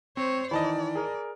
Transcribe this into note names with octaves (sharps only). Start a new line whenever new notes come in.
C4 C5 C#5
D#3 E3 D5 D#5 A5 B5
G#4 A#4